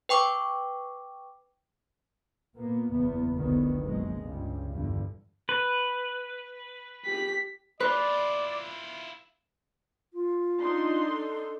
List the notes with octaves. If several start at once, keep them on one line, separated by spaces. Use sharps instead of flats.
B4 G5 C#6 D6
A#2 A#3 B3
F#1 E2 B3
F1 C2 D3 D#3 B3
A#1 F#2 G#3
C#2 G2
E2 G2 D3
B4
G4 B6
E4 F4 B4 D5
F4
D4 D#4 C6
A4